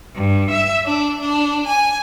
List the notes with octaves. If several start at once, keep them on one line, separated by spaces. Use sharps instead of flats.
G2
E5
D4
D4
G#5